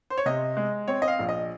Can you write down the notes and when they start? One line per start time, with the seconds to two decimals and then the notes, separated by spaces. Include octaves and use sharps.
0.10 C5
0.18 C#5
0.26 C3 D#5
0.57 G#3
0.88 C4 C#5
1.02 D#5
1.08 F5
1.19 A#1
1.29 D#5